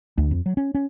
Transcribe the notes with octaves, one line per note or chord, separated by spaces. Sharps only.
D2
F2
F#3
C#4
C#4